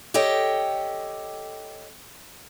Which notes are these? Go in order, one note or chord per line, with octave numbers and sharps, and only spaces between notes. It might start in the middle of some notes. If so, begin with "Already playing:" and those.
G4 A4 C#5 D#5 G5